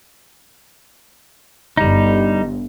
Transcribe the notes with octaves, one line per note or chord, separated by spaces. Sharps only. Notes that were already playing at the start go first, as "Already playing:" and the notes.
G1 G2 G3 D#4